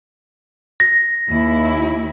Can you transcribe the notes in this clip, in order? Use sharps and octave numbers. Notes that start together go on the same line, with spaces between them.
A#6
D#2 E4